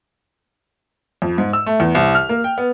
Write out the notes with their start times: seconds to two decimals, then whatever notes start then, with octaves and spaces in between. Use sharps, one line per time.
1.22 F2
1.38 G#2
1.53 E6
1.66 A3
1.80 E2
1.95 C2
2.15 F6
2.29 A#3
2.44 G5
2.58 B3